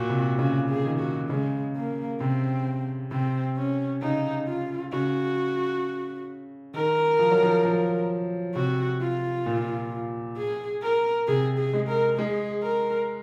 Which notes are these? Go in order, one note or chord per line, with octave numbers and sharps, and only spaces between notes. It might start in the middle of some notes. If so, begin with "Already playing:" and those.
Already playing: A#2 F#4
C3
C#3 F#4
G#4
D#3
F#4
C#3 G#3
A#3
C3 C4
C3 C4
C#4
C#3 D#4
F4
C#3 F#4
D#3 A#4
F3
F#3
F3
F3
C3 F#4
F4
A#2
G#4
A#4
C3 G#4
G#4
G#3
A#4
G#3 G#4
A#4